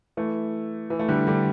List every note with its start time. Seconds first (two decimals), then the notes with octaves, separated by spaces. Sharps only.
0.17 E3 A3
0.90 E3
0.99 A3
1.09 D3 G3
1.27 D3 G3